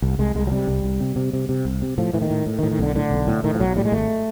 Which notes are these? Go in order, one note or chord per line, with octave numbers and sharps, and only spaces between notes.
C2
C2 G#3
C2 G#3
F#3
C3 G3
C2
C2
C3
C3
C3
C3
C2
C3
A2 F3
A2 E3
D#3
A2
A2
D#3
A2
D#3
B1 D3
A2 D3
B1
A2
A2 D#3
F3
B1 F#3
A2 G3
G#3
G#1 A3